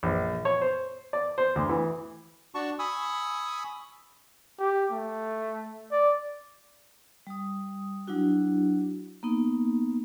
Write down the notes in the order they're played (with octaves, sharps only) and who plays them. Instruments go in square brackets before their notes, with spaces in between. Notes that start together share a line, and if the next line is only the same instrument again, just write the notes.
[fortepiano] A#1
C#5
C5
D5
C5
D2
E3
[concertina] D4 F#4 A5 C#6
G#5 B5 C#6 D#6 E6
[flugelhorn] G4
A3
D5
[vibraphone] G3 D#6
F#3 D4 E4 F#4
A#3 B3 D#4